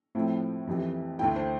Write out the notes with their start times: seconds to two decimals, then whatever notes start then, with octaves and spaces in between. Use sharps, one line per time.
0.15 A2 F3 A3 C4 E4
0.67 F2 C3 E3
1.19 D2 D3 A3 E4 G5
1.36 C5